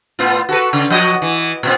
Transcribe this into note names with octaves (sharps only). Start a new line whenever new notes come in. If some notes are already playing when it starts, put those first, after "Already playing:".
A2 B3 F4
F#4 A4 B4
C#3
F3 F#4 D#5
E3
A#2 B3 C4